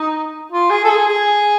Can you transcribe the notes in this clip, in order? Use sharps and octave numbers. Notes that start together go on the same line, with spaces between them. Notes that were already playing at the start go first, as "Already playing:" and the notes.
Already playing: D#4
F4
G#4
A4
G#4
G#4